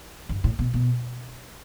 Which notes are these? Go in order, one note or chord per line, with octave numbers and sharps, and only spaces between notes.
G2
A2
B2
B2